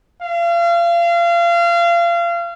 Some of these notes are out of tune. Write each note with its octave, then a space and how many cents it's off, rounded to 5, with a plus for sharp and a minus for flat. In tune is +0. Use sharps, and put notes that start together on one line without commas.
F5 -30